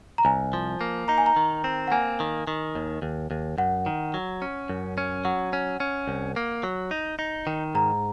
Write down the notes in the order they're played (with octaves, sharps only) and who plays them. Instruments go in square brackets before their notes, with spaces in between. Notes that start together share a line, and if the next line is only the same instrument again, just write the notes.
[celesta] A#5
[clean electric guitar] C2 [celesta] G#5
[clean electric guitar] F3
A#3
[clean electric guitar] D#4 [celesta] A#5
[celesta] G#5
A#5
[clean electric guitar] D#3
C4
[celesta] F#5
[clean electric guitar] A#3 [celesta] G#5
[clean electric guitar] D#3
D#3
D#2
D#2
D#2
[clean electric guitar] F#2 [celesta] F#5
[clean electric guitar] D#3
F#3
C#4
F#2
C#4
[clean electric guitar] F#3 [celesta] F#5
[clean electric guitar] C#4
C#4
C2
A#3
F#3
D#4
D#4
D#3
[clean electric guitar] G#2 [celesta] A#5